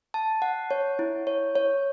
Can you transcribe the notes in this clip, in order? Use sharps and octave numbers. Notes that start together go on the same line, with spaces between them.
A5
F#5
C#5
E4
C#5
C#5